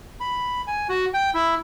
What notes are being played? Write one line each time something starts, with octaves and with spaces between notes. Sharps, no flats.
B5
G#5
F#4
G5
E4